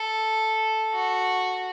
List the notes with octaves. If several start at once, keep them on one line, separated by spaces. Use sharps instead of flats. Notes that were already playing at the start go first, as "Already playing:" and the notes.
Already playing: A4
F#4